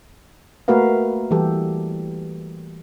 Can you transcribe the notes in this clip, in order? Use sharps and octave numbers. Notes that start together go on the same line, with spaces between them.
A3 A#3 F#4 A#4 B4 F5
E3 G3 G4 A4